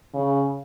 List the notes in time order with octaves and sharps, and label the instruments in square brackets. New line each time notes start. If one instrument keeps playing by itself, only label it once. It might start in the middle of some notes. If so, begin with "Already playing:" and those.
[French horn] C#3